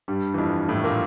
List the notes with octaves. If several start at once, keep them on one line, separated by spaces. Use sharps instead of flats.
G2 G3
E3
F2 F3
A2 A3
A#2 A#3